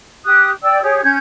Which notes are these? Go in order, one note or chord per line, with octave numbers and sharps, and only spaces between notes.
G4 D#6 F#6
D5 G5 E6
G4 G#4 C#5
C#4 G6 G#6